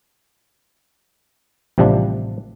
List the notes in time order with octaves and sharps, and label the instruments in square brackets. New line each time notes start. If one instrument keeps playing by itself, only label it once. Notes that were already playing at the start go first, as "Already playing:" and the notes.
[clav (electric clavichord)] A1 C3 F3 G3 D4